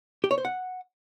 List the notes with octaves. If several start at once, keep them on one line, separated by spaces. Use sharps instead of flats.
G4
C#5
C5
F#5